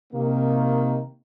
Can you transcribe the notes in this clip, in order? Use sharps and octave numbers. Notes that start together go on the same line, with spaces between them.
C3 D#3 A#3